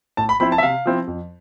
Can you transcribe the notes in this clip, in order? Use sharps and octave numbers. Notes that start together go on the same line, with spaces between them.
A2 A5
B5
F3 C4 E4 B5
A5
E5
C3 F5
F3 C4 E4
F2